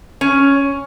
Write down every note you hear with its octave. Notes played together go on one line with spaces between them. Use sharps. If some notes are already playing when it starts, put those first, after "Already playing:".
C#4